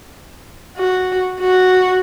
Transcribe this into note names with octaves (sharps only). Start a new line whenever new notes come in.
F#4
F#4